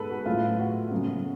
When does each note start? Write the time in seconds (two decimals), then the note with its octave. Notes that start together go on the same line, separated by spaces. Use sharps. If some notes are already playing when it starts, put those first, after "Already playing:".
Already playing: G#2 G#3 B3 A4 B4
0.10 F#4
0.26 A2 F#3 A3 F4
0.59 F#4
0.91 F#2 C#3 F#3 B3